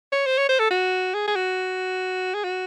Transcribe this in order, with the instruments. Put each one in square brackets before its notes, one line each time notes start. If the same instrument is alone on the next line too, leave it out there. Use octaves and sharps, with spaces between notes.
[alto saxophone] C#5
C5
C#5
C5
A4
F#4
G#4
G#4
F#4
G#4
F#4